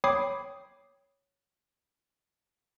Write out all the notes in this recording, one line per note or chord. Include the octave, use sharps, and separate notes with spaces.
C#5 G5 B5 D6 D#6 C7